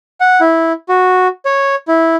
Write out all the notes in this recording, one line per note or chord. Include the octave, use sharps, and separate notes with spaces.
F#5
E4
F#4
C#5
E4